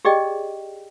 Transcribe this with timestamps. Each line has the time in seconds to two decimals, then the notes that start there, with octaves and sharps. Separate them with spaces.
0.05 G4 G#4 D5 D#5 G5